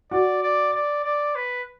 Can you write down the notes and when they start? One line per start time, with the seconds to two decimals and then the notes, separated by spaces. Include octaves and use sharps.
0.11 F#4 D5
0.43 D5
0.73 D5
1.04 D5
1.35 B4